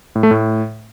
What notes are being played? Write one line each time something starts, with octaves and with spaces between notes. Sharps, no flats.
A2
A3
A2